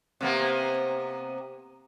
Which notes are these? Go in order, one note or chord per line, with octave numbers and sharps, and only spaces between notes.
C3 A#3 B3